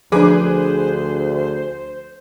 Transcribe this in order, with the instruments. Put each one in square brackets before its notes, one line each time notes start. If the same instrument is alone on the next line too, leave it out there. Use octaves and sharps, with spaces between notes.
[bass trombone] D2 [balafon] F3 D4 [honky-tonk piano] G#4 B4 D6 [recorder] C5